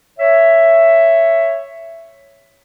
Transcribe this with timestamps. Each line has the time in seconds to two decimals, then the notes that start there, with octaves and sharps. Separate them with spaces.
0.18 C#5 E5